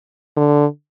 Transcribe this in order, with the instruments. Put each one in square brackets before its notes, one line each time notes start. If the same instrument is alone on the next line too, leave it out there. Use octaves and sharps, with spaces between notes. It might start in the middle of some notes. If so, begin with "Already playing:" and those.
[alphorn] D3